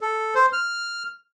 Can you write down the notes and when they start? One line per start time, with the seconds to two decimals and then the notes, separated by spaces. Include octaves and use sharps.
0.01 A4
0.35 C5
0.53 F6